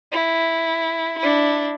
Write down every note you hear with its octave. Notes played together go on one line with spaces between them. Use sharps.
E4
D4 E4